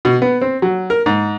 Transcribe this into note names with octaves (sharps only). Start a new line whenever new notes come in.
B2
B3
C4
F#3
A#4
G#2